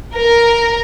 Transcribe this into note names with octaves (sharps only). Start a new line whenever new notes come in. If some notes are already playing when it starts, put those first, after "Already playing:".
A#4